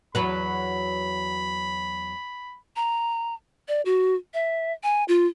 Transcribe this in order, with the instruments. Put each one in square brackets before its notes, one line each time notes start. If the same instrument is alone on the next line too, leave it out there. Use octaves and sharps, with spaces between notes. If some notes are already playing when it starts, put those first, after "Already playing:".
[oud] E2 F#3 B4 [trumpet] B5
[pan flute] A#5
D5
F#4
E5
G#5
F4